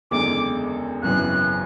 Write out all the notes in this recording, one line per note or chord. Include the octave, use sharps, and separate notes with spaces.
F#1 E2 D3 G#3 D6
G#1 F#2 C#3 E3 B3 F#6